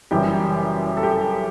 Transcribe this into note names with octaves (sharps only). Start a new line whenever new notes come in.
F#1 F#2 E3 G3 G4
A4
G4